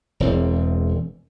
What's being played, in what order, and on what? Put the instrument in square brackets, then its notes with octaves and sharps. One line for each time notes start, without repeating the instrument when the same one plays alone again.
[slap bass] E1 E2 C4